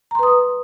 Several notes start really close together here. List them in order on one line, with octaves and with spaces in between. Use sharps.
A#5 C6 B4 D#6